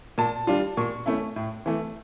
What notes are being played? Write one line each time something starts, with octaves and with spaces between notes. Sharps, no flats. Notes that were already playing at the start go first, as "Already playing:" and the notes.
A#2 A5
G3 D4 F4
A#2 C#6
A3 C#4 E4
A2
E3 A3